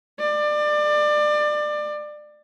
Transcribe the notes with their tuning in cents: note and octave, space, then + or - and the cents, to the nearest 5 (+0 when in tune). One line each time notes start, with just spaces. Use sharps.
D5 +25